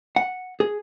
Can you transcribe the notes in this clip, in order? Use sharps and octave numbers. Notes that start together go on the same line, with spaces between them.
F#5
G#4